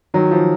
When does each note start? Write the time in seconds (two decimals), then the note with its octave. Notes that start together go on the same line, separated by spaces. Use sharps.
0.14 D#3 F#3
0.31 F3